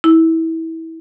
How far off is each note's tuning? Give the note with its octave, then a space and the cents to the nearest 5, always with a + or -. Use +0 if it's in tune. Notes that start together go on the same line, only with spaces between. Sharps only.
E4 -25